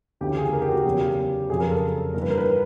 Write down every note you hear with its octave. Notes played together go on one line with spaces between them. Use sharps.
D2 C#3 E3 G4
G#4
A#4
G4
F#4
G4
E2 C#3 F#3
F2 C#3 F#3 G#4
A#4
A4
G2 E3 G3 A#4
B4
A#4
B4